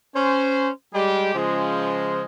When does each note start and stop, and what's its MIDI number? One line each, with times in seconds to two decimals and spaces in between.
0.16 0.70 61
0.16 0.70 72
0.94 1.33 55
0.94 1.33 56
0.94 1.33 67
1.35 2.23 49
1.35 2.23 53
1.35 2.23 56